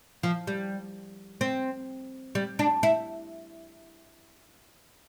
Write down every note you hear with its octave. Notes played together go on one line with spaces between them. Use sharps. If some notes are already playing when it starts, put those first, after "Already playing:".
F3
G3
C4
G3
D4
E4